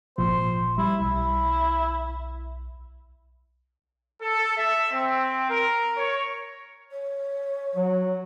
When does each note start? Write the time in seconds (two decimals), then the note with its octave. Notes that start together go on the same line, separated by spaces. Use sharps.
0.18 G#1 A#2 F3 C5
0.78 G3 E4
1.01 B1 E4
4.21 A4
4.56 E5
4.91 C4
5.50 A#4
5.97 C#5
6.91 C#5
7.75 F#3